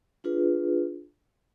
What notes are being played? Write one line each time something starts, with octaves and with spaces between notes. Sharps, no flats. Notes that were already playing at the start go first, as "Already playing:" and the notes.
D4 F4 G#4 B4